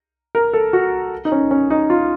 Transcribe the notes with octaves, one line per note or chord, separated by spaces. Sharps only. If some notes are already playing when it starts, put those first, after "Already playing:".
A#4
A4
F#4
D#4
C#4
C#4
D#4
F4